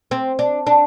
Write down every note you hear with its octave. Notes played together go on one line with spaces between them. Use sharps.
C4
D4
D4